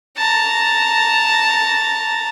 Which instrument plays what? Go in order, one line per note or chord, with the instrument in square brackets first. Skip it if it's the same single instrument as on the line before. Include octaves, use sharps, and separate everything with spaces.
[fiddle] A5 A#5